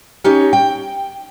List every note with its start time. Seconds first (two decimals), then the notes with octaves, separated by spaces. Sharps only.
0.24 C#4 D#4 G4 C#5
0.53 G5